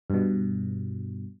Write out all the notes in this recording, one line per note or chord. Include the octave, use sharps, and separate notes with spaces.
G2 B2